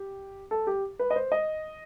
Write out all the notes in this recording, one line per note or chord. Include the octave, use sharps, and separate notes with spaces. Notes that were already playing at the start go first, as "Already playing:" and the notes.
Already playing: G4
A4
G4
B4
D#5
C5
D#5